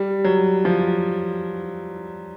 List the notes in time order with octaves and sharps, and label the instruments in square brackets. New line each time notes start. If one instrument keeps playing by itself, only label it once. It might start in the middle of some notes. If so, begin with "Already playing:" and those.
Already playing: [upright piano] G3
F#3
F3